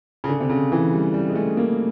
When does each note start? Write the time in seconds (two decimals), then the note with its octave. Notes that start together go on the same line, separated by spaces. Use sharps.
0.24 C#3
0.28 D3
0.40 C3
0.49 C#3
0.72 E3
0.93 G3
1.14 G3
1.30 G#3
1.35 A3
1.57 A#3